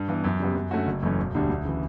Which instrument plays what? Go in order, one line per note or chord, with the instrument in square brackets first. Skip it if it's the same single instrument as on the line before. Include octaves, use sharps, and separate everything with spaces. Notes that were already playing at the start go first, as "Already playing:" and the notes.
Already playing: [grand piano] G2
E3 B3
F#2
C#3 G3 B3
F#2
D3 A3 C#4 F#4
F#1
F#2 E3 A3 C#4
E1
D2 D3 G3 D4
D2
C#3 E3